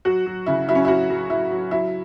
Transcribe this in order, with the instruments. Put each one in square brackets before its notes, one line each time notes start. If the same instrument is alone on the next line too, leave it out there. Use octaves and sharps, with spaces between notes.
[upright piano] F#3 F#4
F#3
C#3 E4
F#3 E4
C#4
E4
F#3 F#4
F#3
F#3 E4
F#3
F#3 E4